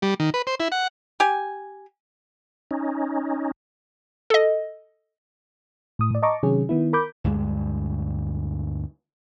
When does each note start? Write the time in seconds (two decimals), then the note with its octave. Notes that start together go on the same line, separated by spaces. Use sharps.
0.02 G3
0.20 D#3
0.34 B4
0.47 C5
0.60 E4
0.72 F#5
1.20 G4 G#5
2.71 C#4 D#4
4.30 A4 D#5
5.99 A2 D#6
6.11 A2 D5
6.23 D#5 A5 A#5 C#6 D6
6.43 C3 D#3 F#3 C#4 G#4
6.69 D#3 B3 E4
6.93 A#4 B5 D6 G6
7.24 D2 G2 G3 G#3